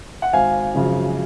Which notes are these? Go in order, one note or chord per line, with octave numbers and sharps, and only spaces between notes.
F#5
G#1 F5 G#5
F#2 C#3 F3